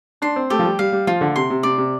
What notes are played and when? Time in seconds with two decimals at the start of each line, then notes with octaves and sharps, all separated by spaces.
0.22 D4 C6
0.36 C4
0.50 A3 G4
0.59 F3
0.65 G3
0.79 G3 F5
0.92 G3
1.07 F3 F4
1.21 D3
1.36 C3 C6
1.50 C3
1.63 C3 D5
1.78 C3